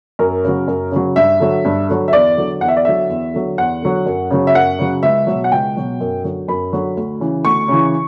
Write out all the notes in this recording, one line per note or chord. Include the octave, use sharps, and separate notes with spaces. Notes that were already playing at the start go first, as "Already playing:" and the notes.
F#2 A#4
C#3 F#3
F#2
C#3 F#3
G2 E5
D3 F#3
G2
D3 F#3
E5
E2 D5
D3 F#3
E2 F#5
E5
D5
D3 F#3 E5
E2
D3 F#3
E2 F#5
D3 F#3
F#2
C#3 F#3
E5
F#2 F#5
C#3 F#3
C#2 E5
B2 F#3
F#5
C#2 G5
B2 F#3
F#2
D3 F#3
F#2 B5
D3 F#3
D2
C#3 E3
D2 C#6
C#3 E3